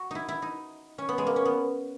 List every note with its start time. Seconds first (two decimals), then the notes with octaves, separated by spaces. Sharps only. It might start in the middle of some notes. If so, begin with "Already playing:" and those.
Already playing: F#4
0.11 D#4 E4
0.28 E4
0.42 D#4
0.98 C#4
1.09 B3
1.18 G#3
1.27 A#3
1.36 C#4
1.45 B3